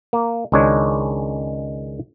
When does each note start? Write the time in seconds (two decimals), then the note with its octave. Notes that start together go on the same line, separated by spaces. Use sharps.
0.13 A#3
0.52 C#2 D#3 G#3 D4 C#5